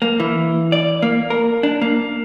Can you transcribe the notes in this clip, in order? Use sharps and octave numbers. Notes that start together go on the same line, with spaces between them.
A#3
E3
D5
A#3
A#4
D4
A#3